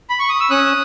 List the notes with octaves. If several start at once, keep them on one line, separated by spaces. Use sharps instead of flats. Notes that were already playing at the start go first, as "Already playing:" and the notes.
B5
C#6
D#6
E6
C#4 D#6 F#6